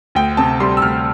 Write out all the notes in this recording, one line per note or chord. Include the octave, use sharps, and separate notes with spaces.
D2 G5
C3 A5
G3 C6
E6
D2 F6